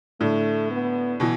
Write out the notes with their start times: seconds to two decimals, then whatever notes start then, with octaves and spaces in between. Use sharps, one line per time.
0.21 A2 D3 A3
0.71 B3
1.20 B2 E3